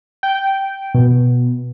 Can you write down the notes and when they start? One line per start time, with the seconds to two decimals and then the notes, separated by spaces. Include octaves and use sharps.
0.23 G5
0.94 B2